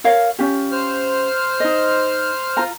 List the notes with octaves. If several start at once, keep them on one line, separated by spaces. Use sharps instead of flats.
A#4 C#5 F5
C#4 F4 G4
C5 F6
D#4 D#5
F4 A#5